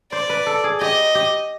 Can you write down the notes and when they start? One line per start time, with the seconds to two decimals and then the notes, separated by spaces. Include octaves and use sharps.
0.12 C5 D5
0.30 B4
0.47 A4
0.64 G#4
0.81 G4 D#5
1.15 G4